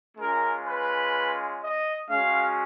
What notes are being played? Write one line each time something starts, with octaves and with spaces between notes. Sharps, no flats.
G#3 C#4 F4 A#4
B4
D#5
G#3 C#4 F#4 F5